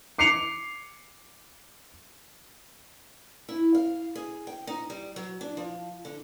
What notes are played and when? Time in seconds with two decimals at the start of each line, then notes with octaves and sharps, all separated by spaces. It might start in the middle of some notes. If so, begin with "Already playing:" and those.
0.18 D6 C7 C#7 F7
3.49 E4
3.75 F5
4.15 G#4
4.47 G5
4.67 D#4
4.90 G3
5.16 F#3
5.41 D4
5.57 F3
6.05 D3